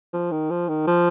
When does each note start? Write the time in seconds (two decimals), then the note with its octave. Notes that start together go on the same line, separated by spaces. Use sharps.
0.13 F3
0.32 D#3
0.50 F3
0.69 D#3
0.87 F3